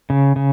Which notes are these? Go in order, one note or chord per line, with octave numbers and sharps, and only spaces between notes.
C#3
C#3